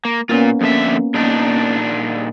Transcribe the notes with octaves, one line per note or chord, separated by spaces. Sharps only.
A#3
A#2 A#3 B3 C#4 F4
F2 D3 E5
A#2 D4 D#4